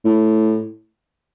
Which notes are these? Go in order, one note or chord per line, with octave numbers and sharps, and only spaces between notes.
A2